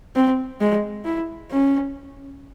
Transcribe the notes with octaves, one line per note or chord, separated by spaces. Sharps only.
C4
G#3
E4
C#4